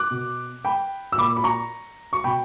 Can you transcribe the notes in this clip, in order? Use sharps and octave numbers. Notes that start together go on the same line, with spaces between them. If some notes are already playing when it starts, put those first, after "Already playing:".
Already playing: D6 F#6
B2
G5 B5
E6
A#2 B5 D6
B5
A#5 C#6
C#6
B2 G5 B5